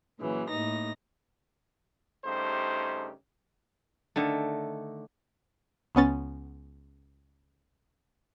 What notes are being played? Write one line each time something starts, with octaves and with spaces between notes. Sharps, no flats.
A#2 C#3 E3 F#3
A2 A#3 D#4 A#6
G2 C#3 A3 D#4 G4 C5
D3 D#3 A3
C#2 B3 C#4 A6